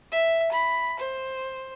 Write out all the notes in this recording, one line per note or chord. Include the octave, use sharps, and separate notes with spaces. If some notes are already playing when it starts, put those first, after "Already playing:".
E5
B5
C5